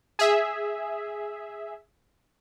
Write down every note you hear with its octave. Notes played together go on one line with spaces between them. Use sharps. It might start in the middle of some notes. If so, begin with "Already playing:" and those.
G#4 E5